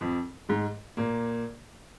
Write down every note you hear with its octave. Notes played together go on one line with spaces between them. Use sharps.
F2 F3
G#2 G#3
A#2 A#3